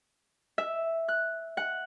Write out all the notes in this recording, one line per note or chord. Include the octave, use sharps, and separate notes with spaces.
E5
F#6
F#5